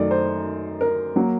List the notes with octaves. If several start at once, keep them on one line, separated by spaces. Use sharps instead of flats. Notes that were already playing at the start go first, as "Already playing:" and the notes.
Already playing: F#2 D#3 A3 D5 D#5
C5
A#4
F#3 A#3